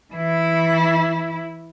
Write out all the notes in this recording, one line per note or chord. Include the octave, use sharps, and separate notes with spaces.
E3 E4